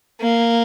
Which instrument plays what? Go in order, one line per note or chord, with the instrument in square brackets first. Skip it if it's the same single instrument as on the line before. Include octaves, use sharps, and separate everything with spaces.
[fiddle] A#3